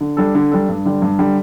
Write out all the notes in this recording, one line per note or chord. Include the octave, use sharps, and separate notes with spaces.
D3
G3 D4 A4
D3
G3 D4 A4
G2
D3 G3
G2
D3 G3